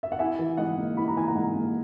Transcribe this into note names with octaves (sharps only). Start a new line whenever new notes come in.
E5
F#5
E4 E5 G#5
E3
G#2 D#5 F#5
A#3
E4 B5
A#5
E3 G#5
F#5 A#5
G#2
A#3